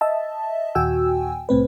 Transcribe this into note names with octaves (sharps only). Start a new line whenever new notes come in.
D#5 E5 A5
D#2 A#2 F#4 G5 G#5 E6
C2 A2 C4 B4